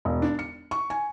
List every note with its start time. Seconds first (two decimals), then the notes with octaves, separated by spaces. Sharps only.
0.05 E1
0.22 D4
0.39 C#7
0.71 C#6
0.90 G#5